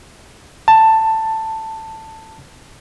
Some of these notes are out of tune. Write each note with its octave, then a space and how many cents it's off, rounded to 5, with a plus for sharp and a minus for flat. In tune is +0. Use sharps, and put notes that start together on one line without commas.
A5 +10